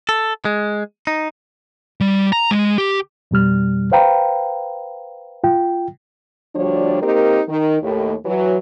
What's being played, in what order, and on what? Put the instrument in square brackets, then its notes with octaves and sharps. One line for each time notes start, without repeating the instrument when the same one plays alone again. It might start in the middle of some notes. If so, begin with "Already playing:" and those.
[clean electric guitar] A4
G#3
D#4
[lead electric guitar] G3
A#5
G#3
G4
[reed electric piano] F2 B2 G3 F6
B4 C5 F5 G5 A#5 B5
F4 G5
[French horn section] D2 F3 G3 D4 F#4 C#5
A#3 C4 D#4 G4 A#4
D#3
D#2 A2
E3 F#3